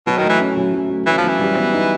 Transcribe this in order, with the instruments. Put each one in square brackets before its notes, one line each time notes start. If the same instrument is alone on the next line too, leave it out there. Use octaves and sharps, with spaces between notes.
[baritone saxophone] B2 [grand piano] F#3
[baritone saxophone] D#3
[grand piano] A3
[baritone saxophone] E3
[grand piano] C#4
F#3
F#3
A3
[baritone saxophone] E3 [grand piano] C#4
[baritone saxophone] F3
[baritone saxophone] E3 [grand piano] F#3
[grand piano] G3
B3
D#4